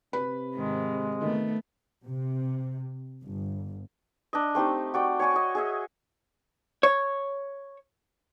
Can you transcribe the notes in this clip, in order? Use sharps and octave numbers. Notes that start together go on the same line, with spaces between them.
C3 B4 B5
G#2 D#3 G#3
D#3 A3 B3
C3
G1
D4 D#5
A3 C4 D#4 G4
F#4 D5 G5
C#5 D5 G#5 C#6
D#5 G#5
G#4 D#5 E5
C#5